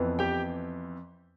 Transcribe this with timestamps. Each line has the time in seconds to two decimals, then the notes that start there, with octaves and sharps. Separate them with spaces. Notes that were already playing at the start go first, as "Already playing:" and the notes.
Already playing: F2 E3 B3
0.19 G4 G5